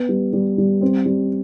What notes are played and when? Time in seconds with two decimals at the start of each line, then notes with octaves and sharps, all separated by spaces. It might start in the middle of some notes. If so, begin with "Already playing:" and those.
Already playing: B3
0.09 G3
0.33 G3
0.58 G3
0.81 C4
1.06 G3